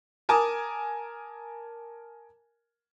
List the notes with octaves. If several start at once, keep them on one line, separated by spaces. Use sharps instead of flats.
A#4 G#5 A5 D6 D#6